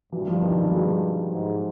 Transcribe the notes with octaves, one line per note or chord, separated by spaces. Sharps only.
G2 E3 F#3
F3 G3
D#3 F3
F#3 G#3
G#2